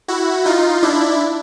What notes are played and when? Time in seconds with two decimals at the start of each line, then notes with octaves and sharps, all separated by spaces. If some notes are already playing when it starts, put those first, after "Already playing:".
0.08 E4 F#4
0.46 D#4 F4
0.83 D4 E4